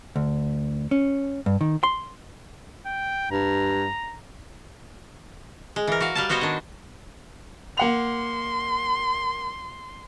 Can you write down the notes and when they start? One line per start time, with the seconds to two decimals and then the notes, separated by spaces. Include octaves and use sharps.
0.16 D2
0.91 C#4
1.46 G2
1.61 D#3
1.83 C6
2.86 G5
3.31 G2 A#5
5.76 G#3
5.87 E3 A#4
6.00 F#4 F5
6.15 G3 F5 A5
6.29 B3 F#4 C5 C#5 D#5
6.41 D#3 D4
7.77 A#3 F#5 C6 F7